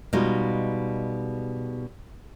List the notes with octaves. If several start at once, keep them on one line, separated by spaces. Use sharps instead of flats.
B2 G3 G#3 D#4 F4